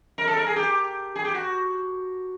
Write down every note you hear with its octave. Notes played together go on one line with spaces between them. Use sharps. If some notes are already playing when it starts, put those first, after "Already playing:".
A#4
A4
A#4
G#4
G4
G#4
G4
F#4